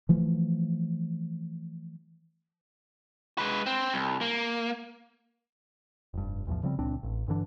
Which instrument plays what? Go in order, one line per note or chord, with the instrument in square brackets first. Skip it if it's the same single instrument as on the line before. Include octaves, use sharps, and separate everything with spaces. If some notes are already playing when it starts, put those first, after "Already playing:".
[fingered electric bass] E3 F3 A3
[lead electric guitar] G#3 B4
C4
C2
A#3
[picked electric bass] F1 G2
B1 E2 A2 F3
C#3 F3 G3 C4
C#2 A#2 C4 D4
A1
G2 D3 E3 D4